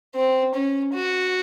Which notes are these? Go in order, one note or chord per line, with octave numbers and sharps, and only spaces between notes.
C4
C#4
F#4